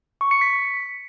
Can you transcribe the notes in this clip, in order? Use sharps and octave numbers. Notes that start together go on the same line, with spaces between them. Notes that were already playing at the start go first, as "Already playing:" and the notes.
C#6
C#7
B6